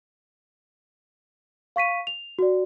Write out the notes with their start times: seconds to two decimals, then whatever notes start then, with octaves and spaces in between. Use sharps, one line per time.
1.76 F5 C#6 B6 D#7
2.07 F7
2.39 F#4 D5